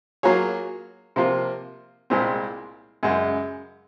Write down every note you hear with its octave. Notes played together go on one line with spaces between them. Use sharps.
F#3 A#3 F4 G#4 C#5
C3 F3 A#3 F4
C2 A#2 G#3 C4
F#2 C#3 G#3